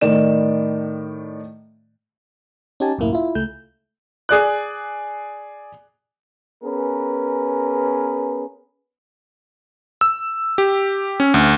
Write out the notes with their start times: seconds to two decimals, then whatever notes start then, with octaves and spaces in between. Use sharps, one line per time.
0.01 A2 D#3 D5 E7
2.80 C#4 D#4 G4 G#5 A5
2.98 C#2 F#2 A2 A#3 E4
3.13 E4 F4
3.35 C#2 A3 G6
4.29 G#4 D5 F#6
6.63 B3 C#4 G#4 A#4 B4
10.01 E6
10.58 G4
11.20 C#4
11.34 D2